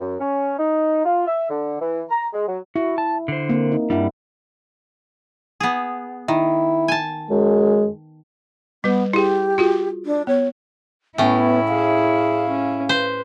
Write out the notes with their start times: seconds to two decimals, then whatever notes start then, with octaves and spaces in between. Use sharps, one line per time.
0.01 F#2
0.20 C#4
0.59 D#4
1.05 F4
1.27 E5
1.50 D3
1.81 E3
2.10 A#5
2.33 G#3
2.47 F#3
2.76 E4 F#4
2.98 A5
3.28 D3 C5
3.49 A#3 C4
3.72 D#4
3.90 G2 G3 D4 E4 F#5
5.60 B3 G#4
6.28 D#3 E4
6.88 G#5 A5
7.30 F#2 G#3
8.84 G3 B3 B4
9.13 E4 G4 G#4
9.58 F4 F#4 G#4
10.05 D4
10.27 B3 C#5
11.18 A2 B3 C#4 E4
11.68 G#4 C#5 F5
12.48 C#4
12.89 B4 C5